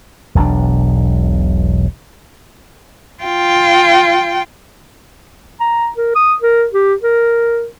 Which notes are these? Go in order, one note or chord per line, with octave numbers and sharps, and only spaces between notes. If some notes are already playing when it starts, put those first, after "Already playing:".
E1 B1 C#3 D4
F4 G5
A#5
A#4
D#6
A#4
G4
A#4